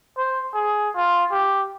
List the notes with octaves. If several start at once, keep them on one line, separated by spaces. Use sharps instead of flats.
C5
G#4
F4
G4